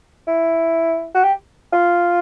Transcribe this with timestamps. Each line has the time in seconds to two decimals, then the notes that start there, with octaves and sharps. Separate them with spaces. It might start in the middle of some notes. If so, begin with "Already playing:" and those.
0.27 E4
1.15 F#4
1.24 G4
1.73 F4